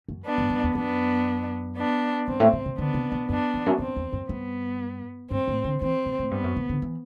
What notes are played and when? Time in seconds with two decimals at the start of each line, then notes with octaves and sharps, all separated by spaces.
0.08 F#2
0.25 B3 D4
0.38 G2
0.50 G2
0.64 E2
0.75 F#2 B3 D4
1.76 B3 D4
2.27 G2 C4
2.40 A2
2.53 B2
2.66 C3
2.78 D3 B3 D4
2.94 C3
3.12 B2
3.28 F#2 B3 D4
3.54 E2
3.66 F#2
3.79 F#2 C4
3.96 E2
4.12 F#2
4.29 G2 B3
5.30 G2 C4
5.48 A2
5.64 D3
5.81 E3 C4
6.06 B2
6.19 A2
6.31 G2 B3
6.44 F#2
6.56 B2
6.69 D3
6.82 E3